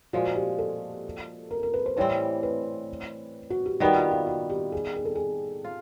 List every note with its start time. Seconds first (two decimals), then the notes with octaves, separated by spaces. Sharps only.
0.13 A#2 F3 G#3 F#4
0.36 G4
0.59 A4
1.51 A#4
1.63 A#4
1.74 B4
1.86 C5
1.97 A2 E3 G3 C4 C5
2.43 B4
3.50 F#4
3.66 G4
3.80 D#3 G3 B3 F#4
3.96 F4
4.11 F4
4.27 F#4
4.50 G4
4.72 G#4
4.96 G#4
5.05 A4
5.15 G#4
5.64 F4